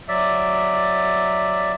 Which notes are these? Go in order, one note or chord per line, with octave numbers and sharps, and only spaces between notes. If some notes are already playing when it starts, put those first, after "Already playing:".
F#3 D5 E5